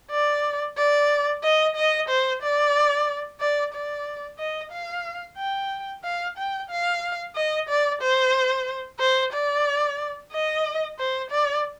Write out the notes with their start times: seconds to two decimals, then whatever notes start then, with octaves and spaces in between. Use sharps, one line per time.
0.11 D5
0.77 D5
1.43 D#5
1.76 D#5
2.09 C5
2.42 D5
3.41 D5
3.73 D5
4.39 D#5
4.72 F5
5.38 G5
6.04 F5
6.37 G5
6.70 F5
7.36 D#5
7.69 D5
8.02 C5
9.00 C5
9.33 D5
10.32 D#5
10.99 C5
11.30 D5